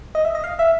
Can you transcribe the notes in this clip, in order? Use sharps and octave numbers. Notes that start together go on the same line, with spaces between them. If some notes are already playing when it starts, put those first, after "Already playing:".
D#5
E5
D#5
F5
E5